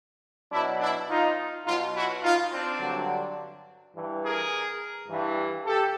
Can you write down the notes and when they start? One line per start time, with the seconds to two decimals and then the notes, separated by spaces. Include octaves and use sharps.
0.51 B2 F#3 D4 E4
0.80 D4 E4
1.08 D#4 F4
1.65 B2 F#3 D#4 F4
1.94 E4 F#4
2.22 D#4 F4
2.51 C4 D4
2.80 G2 D3 F#3
3.94 G2 E3
4.23 G#4 A#4
5.08 G2 E3
5.65 G4 A4